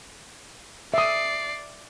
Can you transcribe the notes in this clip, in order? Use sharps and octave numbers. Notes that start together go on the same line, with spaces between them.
D5 E5 D#6 C7